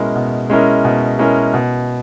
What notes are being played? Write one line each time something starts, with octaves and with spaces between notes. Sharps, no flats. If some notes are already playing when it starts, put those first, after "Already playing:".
Already playing: B2 G#3 C#4 E4 A#4
B2
G#3 C#4 E4 A#4
B2
G#3 C#4 E4 A#4
B2